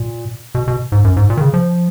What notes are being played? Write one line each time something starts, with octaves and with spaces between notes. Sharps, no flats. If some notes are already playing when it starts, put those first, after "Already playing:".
Already playing: A#2
B2
B2
G#2
F#2
G#2
A#2
D#3
C#3
F3